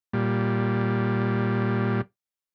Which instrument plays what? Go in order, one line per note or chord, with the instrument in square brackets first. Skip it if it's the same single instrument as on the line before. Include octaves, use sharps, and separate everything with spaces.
[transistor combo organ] A#2 G3